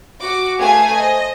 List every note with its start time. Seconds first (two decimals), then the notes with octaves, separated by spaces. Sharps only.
0.21 F#4 D6
0.59 A3 G#4 B4 F5 G#5 G#6
0.98 C5 D#5